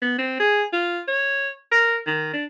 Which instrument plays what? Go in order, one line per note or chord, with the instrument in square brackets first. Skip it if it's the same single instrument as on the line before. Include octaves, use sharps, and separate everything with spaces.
[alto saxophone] B3
C4
G#4
F4
C#5
A#4
D#3
D4